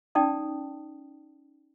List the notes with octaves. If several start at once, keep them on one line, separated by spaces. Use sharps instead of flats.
C#4 D#4 D5 G5 A5 D#6